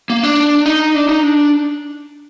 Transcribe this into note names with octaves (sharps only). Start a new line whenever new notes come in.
A#3
D4
D#4
D4
D#4
D4